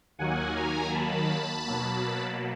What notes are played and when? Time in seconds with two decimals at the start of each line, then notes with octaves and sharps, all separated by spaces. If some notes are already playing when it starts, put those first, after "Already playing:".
0.18 D#2 D#3 F#3 A#3 F#5 G#5
0.55 G#5 A#5
0.92 A5 B5
1.65 B2 F#3 A#3